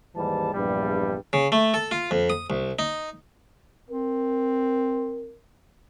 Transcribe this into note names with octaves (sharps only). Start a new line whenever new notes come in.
D#2 G#2 E3 G3 A5
A#1 E2 G2 G3
C#3
A3
A4
F4
F2
D#6
C2
D#4
C4 A#4